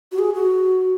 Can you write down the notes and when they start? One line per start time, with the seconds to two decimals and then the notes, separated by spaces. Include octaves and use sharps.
0.12 F#4
0.19 G#4
0.35 F#4